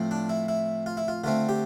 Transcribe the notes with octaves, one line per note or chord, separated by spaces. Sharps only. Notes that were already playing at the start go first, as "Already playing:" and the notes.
Already playing: A2 F3 C4
D4
E4
E4
F4
E4
F4
D3 A3 C4 F4
G4